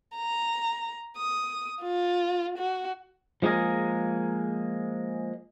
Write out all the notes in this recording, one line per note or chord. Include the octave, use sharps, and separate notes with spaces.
A#5
D#6
F4
F#4
F3 G#3 A#3 G#4 A#4